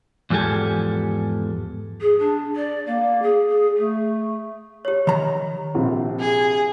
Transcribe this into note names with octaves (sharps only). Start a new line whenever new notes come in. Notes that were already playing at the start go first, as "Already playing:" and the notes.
E2 G#2 F3 G4 A4 G#5
G#4
D4
D5
A#3
G#4
G#4
A3
G4 C#5
D#3 A#5
A#1 C3 C4
G#4